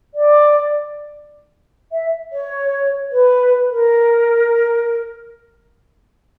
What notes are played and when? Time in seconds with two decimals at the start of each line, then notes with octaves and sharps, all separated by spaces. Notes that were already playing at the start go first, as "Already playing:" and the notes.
0.14 D5
1.91 E5
2.32 C#5
3.11 B4
3.70 A#4